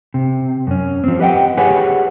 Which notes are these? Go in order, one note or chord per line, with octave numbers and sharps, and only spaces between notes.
C3
F#2 C#4
F3 C4
G4 B4 D#5 F#5 G5
G4 G#4 B4 C#5 F#5 G#5